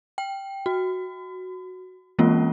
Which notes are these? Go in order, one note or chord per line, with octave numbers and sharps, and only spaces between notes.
G5
F#4
E3 G#3 A#3 C4 C#4 F4